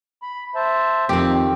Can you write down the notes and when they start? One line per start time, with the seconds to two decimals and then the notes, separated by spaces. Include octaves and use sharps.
0.23 B5
0.55 C5 E5 A5
1.09 F2 D#3 C4 G4